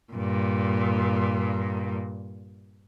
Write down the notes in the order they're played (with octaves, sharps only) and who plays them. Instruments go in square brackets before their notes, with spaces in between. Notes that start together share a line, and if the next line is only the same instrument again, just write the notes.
[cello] G2 A#2